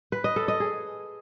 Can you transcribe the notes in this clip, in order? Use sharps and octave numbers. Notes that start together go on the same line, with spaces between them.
B4
D#5
A4
D#5
G#4